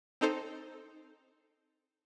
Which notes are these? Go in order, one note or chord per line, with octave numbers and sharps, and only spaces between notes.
C4 D#4 A4 C5